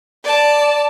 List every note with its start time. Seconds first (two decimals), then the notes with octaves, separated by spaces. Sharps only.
0.24 D5 A5